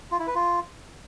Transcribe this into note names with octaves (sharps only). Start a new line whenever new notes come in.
F4
E4
B4
F4